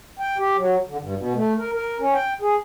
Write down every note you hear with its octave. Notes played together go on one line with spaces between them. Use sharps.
G5
G4
F#3
D3
G2
B2
A3
A#4
A#4
C#4
G5
G#4